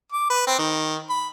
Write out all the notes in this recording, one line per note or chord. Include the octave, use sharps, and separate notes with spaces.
D6
B4
C4
D#3
B5